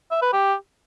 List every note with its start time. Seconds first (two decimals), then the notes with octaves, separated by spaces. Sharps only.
0.11 E5
0.22 B4
0.33 G4